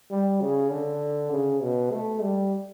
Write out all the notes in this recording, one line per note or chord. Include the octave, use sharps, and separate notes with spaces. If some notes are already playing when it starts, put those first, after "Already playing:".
G3
C#3
D3
C#3
B2
A3
G3